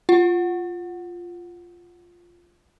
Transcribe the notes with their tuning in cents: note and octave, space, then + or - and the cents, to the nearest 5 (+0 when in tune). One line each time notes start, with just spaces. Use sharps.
F4 +0 F#5 +0